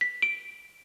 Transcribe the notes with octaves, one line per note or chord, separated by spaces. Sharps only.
B6
D7